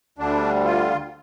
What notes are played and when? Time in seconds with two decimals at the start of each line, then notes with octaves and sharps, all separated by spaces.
0.18 D2 D3 G3 D4
0.65 F4